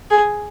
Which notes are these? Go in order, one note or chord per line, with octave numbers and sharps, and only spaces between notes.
G#4